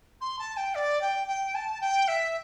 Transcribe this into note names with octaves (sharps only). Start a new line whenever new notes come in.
C6
A5
G5
D5
G5
G5
A5
G5
E5